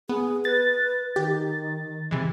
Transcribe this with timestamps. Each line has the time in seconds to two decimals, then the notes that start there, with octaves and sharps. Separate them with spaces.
0.09 B3 G#4
0.45 B4 A6
1.16 D#3 G4
2.11 C3 E3 G#3